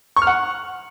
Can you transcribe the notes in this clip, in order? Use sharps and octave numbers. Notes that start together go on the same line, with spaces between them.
C#6
F6
F#5